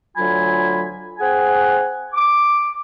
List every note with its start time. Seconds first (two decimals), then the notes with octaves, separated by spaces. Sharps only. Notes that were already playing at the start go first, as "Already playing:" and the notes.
0.16 D2 F#3 F4 G#5 B5
1.19 C4 G#4 F#5 G#5
2.14 D6